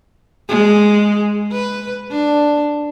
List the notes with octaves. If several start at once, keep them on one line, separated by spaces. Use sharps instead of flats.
G#3
B4
D4